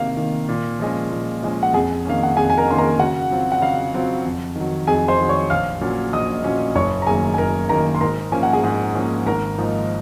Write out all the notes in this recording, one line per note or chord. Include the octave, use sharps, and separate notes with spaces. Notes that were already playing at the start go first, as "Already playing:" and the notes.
Already playing: C3 D#3 A#3 F5
D#3 A#3
A#2
F3 G#3 C#4
A#2
F3 G#3 C#4
F#5
F2 G#4 G#5
D#3 A#3 C#4 F5
F#5
F2 G#4 G#5
G#5
A#4 A#5
D#3 A#3 C#4 C6
A#4 A#5
C#3 F#4 F#5
F#3 C4 F4
F#5
C#3 F5
F#3 C4 F4
F2
D#3 F#3
F2 G#4 G#5
C5 C6
D#3 F#3
C#5 C#6
A#1 F5 F6
A#2 F#3 C#4
A#1 D#5 D#6
A#2 F#3 C#4
F#1 C#5 C#6
A#5
F#2 D#3 A#3 G#4 G#5
G#5
F#1 A#4 A#5
F#2 D#3 A#3 A#4 A#5
C6
G#2 A#4 A#5
F3 A#3 C#4 G#5
F#5
G#4 G#5
G#2
F3 A#3 C#4
G#1 A#4 A#5
G#2 F3 A#3 D#4